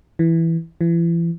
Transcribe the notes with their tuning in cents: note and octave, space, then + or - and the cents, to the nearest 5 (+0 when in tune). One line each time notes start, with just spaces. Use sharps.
E3 +0
E3 +35